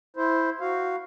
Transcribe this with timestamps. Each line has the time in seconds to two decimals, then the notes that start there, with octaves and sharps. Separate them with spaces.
0.16 E4 C5
0.61 F#4 F5